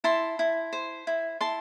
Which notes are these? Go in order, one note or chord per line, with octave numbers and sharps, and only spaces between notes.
E4 A5 C6
E4
C5
E4
E4 A5 C6